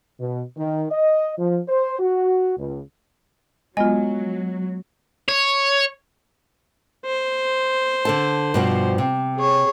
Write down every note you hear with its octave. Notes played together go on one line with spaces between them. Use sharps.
B2
D#3
D#5
F3
C5
F#4
C#2
F#3 G#3 B3 F4 D#5 G#5
C#5
C5
D3 A4 A5
G2 B2 F3
C3
G#4 C#5